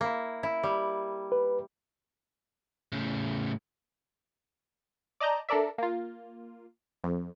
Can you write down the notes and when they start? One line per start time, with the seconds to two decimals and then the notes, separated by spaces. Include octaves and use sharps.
0.01 A#3 E4
0.43 E4
0.63 G3
1.32 B4
2.92 A2 C#3
5.20 D5 D#5 A5 A#5 G6
5.49 D4 A4 A#4 D5 E5
5.78 A#3 F4
7.04 F2